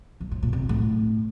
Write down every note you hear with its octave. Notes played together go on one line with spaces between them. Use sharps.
G2
A2
A#2
C3
A2